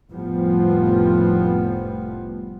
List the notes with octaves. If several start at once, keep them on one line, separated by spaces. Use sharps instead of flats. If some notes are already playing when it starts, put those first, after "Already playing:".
F1 A2 F3 G3 B3